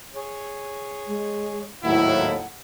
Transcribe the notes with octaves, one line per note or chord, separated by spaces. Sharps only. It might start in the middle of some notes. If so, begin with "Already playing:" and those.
G#4 C#5
G#3
G#1 D#2 A2 F#3 D#4 E4 F#5